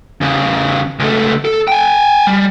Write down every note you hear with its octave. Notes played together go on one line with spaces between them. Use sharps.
E2 C#3
C#2 A3
A4
G5 G#5
G3